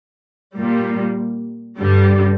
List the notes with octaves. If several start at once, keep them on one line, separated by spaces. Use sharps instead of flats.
A#2 G3 A#3
G2 D3 G3